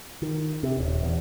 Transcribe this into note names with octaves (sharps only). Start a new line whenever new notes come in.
D#3
C3
D#1
E2